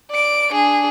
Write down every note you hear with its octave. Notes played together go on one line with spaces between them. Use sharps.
D5 D7
D4 G#4